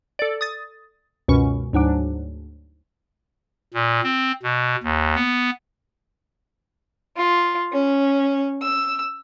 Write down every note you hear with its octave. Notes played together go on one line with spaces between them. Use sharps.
A4 D5
D#6 A6
C#2 F#2 B2 C#4 C#6
D2 G#2 F#3 D4
A#2
C4
B2
D#2
B3
F4
C#4
E6